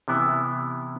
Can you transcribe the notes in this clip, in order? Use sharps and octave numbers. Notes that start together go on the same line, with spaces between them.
C3 E3 B3 E4